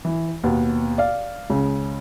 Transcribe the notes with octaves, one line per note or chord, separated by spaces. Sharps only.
E3
D#2 B2 B3
D5 F5
C#2 C#3